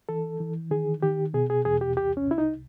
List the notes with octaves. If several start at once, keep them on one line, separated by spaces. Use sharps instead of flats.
E3 A4
E3
D#3 G#4
D#3 G4
B2 G#4
G#4
E2 G#4
G4
C2 G4
C#4
C2 E4
D#4